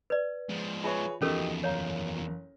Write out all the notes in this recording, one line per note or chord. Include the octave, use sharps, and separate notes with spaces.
B4 D5
F3 G#3
F4 G#4 B4 C#5 E5
E2 F3 C#4 D#4 F#4 G4 A4 A#4
F#1 C#5 F5 A#5